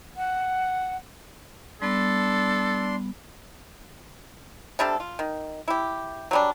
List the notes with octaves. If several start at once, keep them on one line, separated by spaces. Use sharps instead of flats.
F#5
G3 B3 D4 A4 C6
C3 G3 D4 A4
F4
D#3
E4 G4
F#3 G3 D4